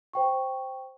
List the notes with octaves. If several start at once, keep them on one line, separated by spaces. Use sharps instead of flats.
C5 G5 C#6